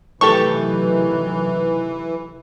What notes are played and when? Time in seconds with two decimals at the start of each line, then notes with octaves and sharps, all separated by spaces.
0.21 C3 D#3 E3 F#3 A3 G4 A4 C#6